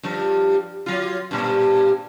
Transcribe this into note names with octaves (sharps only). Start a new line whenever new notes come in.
G2 F3
F#3 F4
G2 A#2